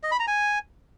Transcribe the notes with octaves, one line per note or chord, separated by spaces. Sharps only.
D#5
B5
A#5
G#5